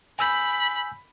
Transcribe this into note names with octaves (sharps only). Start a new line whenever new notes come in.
G#5 B5 E6 G6